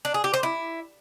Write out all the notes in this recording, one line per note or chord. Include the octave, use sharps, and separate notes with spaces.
D4
G#4
G4
C5
E4